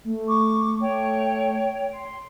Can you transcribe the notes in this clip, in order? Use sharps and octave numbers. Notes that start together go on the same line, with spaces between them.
A3
C#6 D6
A3 C#5 G5
C6